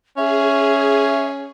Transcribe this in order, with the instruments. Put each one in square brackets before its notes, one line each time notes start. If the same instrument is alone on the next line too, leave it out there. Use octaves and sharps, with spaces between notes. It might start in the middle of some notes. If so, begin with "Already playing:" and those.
[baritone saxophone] C#4 [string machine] G#4 [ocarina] E5